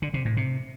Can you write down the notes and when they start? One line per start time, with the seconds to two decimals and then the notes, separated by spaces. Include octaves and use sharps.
0.02 D3
0.14 C3
0.25 A2
0.37 C3